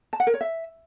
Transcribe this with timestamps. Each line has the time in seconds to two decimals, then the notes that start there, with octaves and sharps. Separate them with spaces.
0.13 A5
0.20 F#5
0.27 A#4
0.34 C#5
0.41 E5